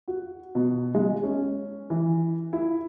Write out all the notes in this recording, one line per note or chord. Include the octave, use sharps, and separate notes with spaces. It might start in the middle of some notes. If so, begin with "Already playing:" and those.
F#4
B2
G#3
C#4
E3
E4